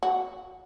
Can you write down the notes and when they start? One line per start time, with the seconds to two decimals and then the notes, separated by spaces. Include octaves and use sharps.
0.03 F#4